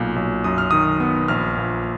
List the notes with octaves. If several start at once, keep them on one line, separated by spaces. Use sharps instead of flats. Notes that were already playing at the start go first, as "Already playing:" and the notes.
Already playing: B1 A#2
B1
F#2 D#6
F6
D#3 D#6
B3
A#1 F6
A#2